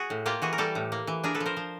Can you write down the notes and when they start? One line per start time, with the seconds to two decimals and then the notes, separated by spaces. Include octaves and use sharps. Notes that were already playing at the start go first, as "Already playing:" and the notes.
Already playing: F#4 G#4
0.10 A2
0.26 A#3 F4 G4
0.42 E3 F#4 G#4
0.53 A#4
0.58 G3 G4 A4
0.75 A2
0.92 A#3
1.07 E3
1.24 D4 G#4 A#4
1.35 A4 B4
1.40 F3
1.46 A#4 C5
1.57 F3